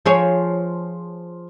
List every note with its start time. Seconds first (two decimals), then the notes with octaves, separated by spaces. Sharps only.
0.05 F3 G#4 C#5